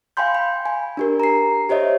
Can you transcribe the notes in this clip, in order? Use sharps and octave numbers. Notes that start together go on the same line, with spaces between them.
F5 G5 G#5 B5 C6 G6
B5
G#5
D4 G4 A#4
A#5 C7
G4 C5 C#5 D#5 E5